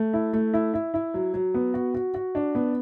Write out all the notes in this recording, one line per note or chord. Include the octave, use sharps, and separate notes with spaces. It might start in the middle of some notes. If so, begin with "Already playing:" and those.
Already playing: A3
E4
A3
E4
E4
E4
F#3
F#3
B3
F#4
F#4
F#4
D4
B3